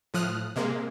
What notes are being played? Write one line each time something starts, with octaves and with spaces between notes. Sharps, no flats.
A2 F3 D#6 F6 F#6
C3 G#3 A#3